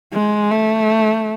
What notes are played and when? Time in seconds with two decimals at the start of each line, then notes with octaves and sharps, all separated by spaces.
0.13 G#3
0.51 A3